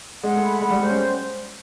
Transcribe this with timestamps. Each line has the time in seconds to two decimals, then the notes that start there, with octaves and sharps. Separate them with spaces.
0.24 G#3 F#5
0.36 A3
0.42 B5
0.61 G#3 F#5
0.71 G3
0.79 G#3 C5
0.90 C#4